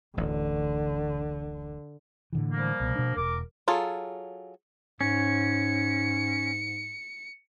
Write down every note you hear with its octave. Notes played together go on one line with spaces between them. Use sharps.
D1 A1 D3
A2 D3 E3
F3 G3 A#3
C2 B2
B2 D4
E1 A#4 D6
F#3 F4 G#4 A4
G#2 C#4 C#7